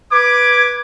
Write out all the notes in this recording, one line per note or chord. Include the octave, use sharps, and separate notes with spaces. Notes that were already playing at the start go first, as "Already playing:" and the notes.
B4 D6 G#6